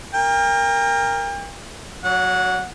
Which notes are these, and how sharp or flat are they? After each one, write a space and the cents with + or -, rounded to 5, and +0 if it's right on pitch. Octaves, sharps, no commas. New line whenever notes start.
A#4 +0 G5 +40
F#3 +0 C#5 +40 F#5 -15